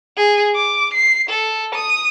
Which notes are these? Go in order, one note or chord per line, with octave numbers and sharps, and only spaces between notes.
G#4
D6
C7
A4
D#6